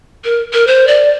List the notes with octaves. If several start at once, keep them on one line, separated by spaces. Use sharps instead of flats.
A#4
A#4
C5
D5